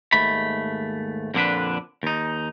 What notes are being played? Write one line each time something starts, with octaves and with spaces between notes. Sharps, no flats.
D#2 G#2 A3 B5
F2 A#2 D3 D4 B4
D#2 D#4